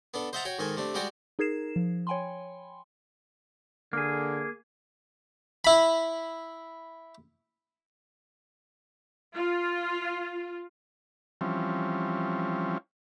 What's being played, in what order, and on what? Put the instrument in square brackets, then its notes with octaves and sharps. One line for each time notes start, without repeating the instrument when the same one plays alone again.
[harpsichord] B3 D4 A4
C5 D#5 E5 F#5 A5 A#5
F#4 C#5 G5
G#2 D#3 A4 G#5
C3 A3 D4
G3 G#3 F#4 G4 D5 F#5
[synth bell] D#4 G#4 A#4 G#6 C7 E7
F3
C#5 G5 G#5 B5 C6
[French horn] D3 [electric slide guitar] A#3 G#4
[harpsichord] E4 B5
[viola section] F4
[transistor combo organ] E3 F3 G3 C4 C#4